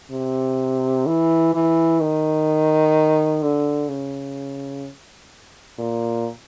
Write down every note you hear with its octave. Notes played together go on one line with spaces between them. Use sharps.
C3
E3
E3
D#3
D3
C#3
A#2